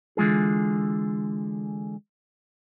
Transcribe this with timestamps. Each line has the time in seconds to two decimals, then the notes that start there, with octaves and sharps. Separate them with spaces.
0.17 D3 E3 G#3 F4 G#4